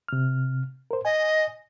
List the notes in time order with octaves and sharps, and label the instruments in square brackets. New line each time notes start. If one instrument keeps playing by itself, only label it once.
[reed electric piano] C3 F6
A#4 C5
[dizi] D#5 [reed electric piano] G#5